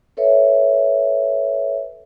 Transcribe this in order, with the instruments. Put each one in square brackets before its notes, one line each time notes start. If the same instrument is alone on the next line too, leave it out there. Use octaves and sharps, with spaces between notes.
[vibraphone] A4 B4 C#5 E5